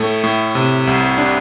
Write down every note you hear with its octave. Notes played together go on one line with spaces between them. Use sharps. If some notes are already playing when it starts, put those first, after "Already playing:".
Already playing: A2 A3
A2
C3
C2
D4